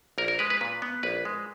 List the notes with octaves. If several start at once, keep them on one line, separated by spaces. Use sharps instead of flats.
A#1 A#4
A#4
G#3 B4
B4
A#2 B4
B3
A#1 B4
G#3